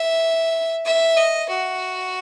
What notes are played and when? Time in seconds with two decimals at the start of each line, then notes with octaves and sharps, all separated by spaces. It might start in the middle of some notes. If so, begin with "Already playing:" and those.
Already playing: E5
0.85 E5
1.17 D#5
1.49 F#4